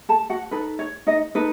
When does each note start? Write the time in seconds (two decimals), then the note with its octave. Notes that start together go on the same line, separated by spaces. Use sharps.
0.09 A4 A5
0.30 F#4 F#5
0.51 D#4 A4 B4
0.79 C#5
1.07 D#4 D#5
1.35 D#4 A4 B4